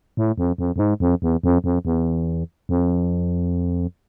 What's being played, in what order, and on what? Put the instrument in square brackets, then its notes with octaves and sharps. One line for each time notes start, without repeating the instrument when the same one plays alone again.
[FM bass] A2
F2
F2
F2
G#2
F2
E2
F2
F2
E2
F2